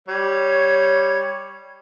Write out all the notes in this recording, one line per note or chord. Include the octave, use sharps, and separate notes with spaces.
G3 C#5